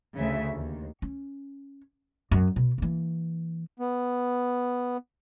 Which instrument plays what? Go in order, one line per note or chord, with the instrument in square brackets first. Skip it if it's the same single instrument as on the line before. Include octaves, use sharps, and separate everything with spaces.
[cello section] D2 C#3 E5
D#2
[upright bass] C#4
F#2
B2
E3 A#3
[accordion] B3